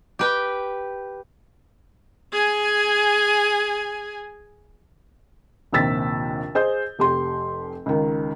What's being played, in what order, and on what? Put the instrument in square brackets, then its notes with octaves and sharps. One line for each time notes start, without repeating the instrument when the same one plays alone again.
[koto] G4 B4 G5
[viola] G#4 G#5
[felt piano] A#1 D#2 C3 E6 A6 B6
G#4 C5 D#5 G6
F1 G4 C6
C#2 D#3